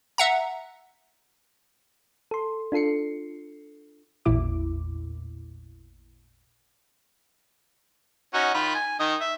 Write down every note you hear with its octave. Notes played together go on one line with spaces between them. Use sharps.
E5 F#5 A#5
A4 C6
D4 F4 A4 C7 C#7
A1 E2 A#2 E4 D6
C#4 D#4 F#4
D#3 F4 B5
G#5
D#3 D#5
E5